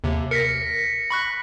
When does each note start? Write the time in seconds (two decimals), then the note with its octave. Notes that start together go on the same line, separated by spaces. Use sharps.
0.04 D#2 C3
0.31 A#4 A#6 B6 C#7
1.10 B5 C#6 F#6